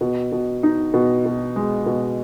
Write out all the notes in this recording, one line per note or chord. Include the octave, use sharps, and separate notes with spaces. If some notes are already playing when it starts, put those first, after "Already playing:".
B2
B2
D#4
B2
B2
G#3
B2